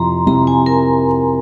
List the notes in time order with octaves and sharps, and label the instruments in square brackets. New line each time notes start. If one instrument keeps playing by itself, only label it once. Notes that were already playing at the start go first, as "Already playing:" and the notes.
Already playing: [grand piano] F2 C3 F3 C4 E4 [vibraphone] A#5 C6
[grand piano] F2 C3 F3 C4 E4 [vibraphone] A#5
[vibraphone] G#5
A#4